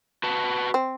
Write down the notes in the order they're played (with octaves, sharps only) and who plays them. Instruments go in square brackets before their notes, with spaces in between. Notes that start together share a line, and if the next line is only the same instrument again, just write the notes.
[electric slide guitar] F#4 B4 A5
[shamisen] C4